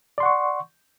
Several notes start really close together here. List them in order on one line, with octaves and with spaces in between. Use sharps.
D5 C6 F#5 C#6